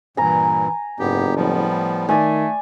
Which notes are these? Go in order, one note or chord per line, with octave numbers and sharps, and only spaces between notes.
G2 A#2 E3 G#5 A#5
F#1 G#2 B3 G4
A2 F3 G3 B3
D#3 A3 D5 G#5